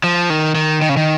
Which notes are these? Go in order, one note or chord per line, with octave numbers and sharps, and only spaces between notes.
F3
D#3
D#3
D#3
C#3
D#3